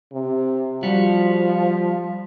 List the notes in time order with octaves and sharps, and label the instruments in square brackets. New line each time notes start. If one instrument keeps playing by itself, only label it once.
[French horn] C3
[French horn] F3 [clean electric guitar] G3 F#4